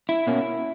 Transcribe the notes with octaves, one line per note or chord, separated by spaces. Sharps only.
E4
B2 A#3 C#4